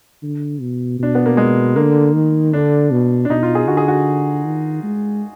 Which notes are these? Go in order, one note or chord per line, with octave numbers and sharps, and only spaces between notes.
D3
B2
B2 D4
B3
A#3
G#3
D3 A#3
D#3
D3 D4
B2
D4
B2 D#4
F4
G#4
D3 F#4
G#4
F#4
D#3
G#3